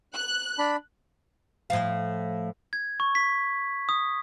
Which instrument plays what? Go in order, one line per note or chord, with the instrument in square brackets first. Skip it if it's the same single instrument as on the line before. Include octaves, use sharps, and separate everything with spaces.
[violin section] F#6
[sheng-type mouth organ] D4 B5
[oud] A2 F3 F5
[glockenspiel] G#6
C#6
B6
D#6